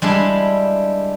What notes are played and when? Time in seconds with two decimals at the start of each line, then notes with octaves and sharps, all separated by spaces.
0.02 G3 G#3 D4 E4